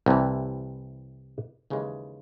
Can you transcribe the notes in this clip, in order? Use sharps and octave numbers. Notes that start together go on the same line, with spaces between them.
C2 C3 E3
D#2 C#3 E3 G#3